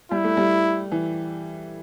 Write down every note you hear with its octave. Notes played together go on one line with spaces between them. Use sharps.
G3 E4
A3
G3
E3